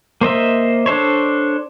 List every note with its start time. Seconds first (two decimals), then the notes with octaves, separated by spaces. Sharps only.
0.21 A#3 C5 D#5 E5
0.86 D4 A4 C5 C#5